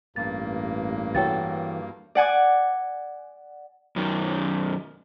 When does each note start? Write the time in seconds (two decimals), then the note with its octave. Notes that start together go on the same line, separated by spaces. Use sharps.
0.16 A1 G2 A#3 A6
1.15 E3 F#4 A4 C#5 G5 A6
2.15 D5 F#5 G#5 D6
3.96 F#2 D#3